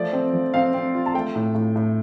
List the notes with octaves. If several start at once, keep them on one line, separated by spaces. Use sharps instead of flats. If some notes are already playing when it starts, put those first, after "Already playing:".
Already playing: F3 A3 D5
C4
F3
C4 F5
C4
F4
A5
A3 G5
A2
A2
A2